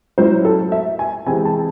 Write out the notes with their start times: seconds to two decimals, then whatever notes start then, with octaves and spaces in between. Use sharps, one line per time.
0.18 A2 F#3 C#4 E4 C5
0.45 A4
0.72 E5
0.99 G#5
1.26 C3 E3 G#3 C4 E4 G#5
1.45 A5